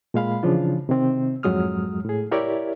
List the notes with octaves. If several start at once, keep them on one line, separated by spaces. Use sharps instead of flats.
A#2 G#3 F5 B5
C#3 E3 F3 D4 F4
C3 D#3 C4
F2 G#2 F#3 G#3 D#6 F6
A2 G#4
E4 G4 A#4 C#5 D5 E5